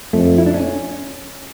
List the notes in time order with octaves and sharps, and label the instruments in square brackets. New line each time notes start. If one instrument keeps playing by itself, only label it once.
[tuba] F2 [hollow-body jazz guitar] A3
[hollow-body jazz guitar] E4
D4
C#4